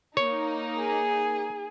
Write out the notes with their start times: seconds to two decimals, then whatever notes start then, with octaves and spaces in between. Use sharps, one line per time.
0.17 A#3 D#4 C#5
0.79 G#4